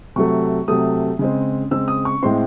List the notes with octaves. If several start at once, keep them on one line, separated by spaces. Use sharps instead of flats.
C3 F#3 A3 C#6
C3 F#3 A3 D#6
C#3 G#3 C4
C#3 G#3 C4 E6
D#6
C#6
A2 G#3 C4 C6